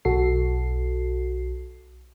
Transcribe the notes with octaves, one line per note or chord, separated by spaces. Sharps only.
B1 F#4 A4 C7